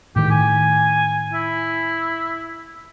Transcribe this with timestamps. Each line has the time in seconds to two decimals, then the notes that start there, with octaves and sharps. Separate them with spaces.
0.16 A2 D#3 G4
0.30 G#5
1.33 E4